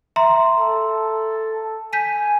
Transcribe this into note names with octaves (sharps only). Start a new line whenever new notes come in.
E5 A#5 C6
A4
G#5 G6 B6 D#7